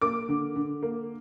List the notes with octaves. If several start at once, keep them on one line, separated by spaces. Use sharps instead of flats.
A#3 D6
D3
D3
A#3